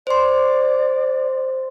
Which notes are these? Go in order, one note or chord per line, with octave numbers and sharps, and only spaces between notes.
C5 D5 C6